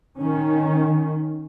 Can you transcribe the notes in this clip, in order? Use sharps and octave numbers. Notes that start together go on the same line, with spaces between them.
D#3 C#4